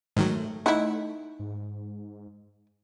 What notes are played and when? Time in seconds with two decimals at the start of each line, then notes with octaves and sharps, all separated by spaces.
0.17 G#2 D#3 F#3 A3
0.66 D#4 E4 F#5
1.40 G#2